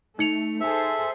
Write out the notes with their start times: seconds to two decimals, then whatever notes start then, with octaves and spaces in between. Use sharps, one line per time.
0.19 A3 D#4 C#7 F7
0.60 G#4 A4 C5 E5